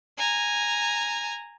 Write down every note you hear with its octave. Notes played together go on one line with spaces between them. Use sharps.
G#5 A#5